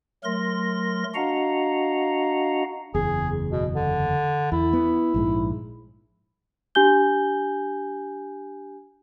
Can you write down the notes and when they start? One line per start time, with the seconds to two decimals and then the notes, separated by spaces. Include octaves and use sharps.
0.24 F#3 A3 A#4 C6 A#6
1.15 D4 F#4 D#5 F5 F#5 A#5
2.95 F#1 E2 G#4
3.51 B2
3.75 D3
4.52 E2 E4
4.73 B3
5.14 A#1 G#2 G#3
6.75 D4 G4 G#5 G6 G7